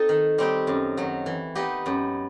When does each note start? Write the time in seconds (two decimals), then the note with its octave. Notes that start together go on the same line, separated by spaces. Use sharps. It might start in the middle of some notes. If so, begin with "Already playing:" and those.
Already playing: C4 D#4 A4 D#5
0.09 D#3
0.38 G3 C4 D#4 G4
0.67 F#2
0.97 D#3 F#3
1.26 E3
1.55 B3 D#4 G4 D#5
1.86 F#2